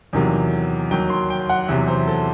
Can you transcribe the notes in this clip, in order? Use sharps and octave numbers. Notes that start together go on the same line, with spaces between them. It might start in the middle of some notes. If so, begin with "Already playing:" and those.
E2 C3 D#3 F#3
D#2 D#3 F#3 G5
C6
G5
F#5
E2 C3 F#3 E5
C5
A4